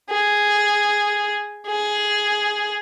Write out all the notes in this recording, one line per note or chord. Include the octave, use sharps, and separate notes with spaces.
G#4
G#4